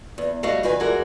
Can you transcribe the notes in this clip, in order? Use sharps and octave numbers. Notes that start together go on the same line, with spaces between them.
E2
G3 A3 F#4 D#5 F5
G2 D#3 F#4 B4 G#5
E3 G3 G#3 F#4 G#4 A#4